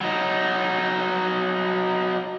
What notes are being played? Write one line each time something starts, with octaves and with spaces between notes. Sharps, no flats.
F#3 D#4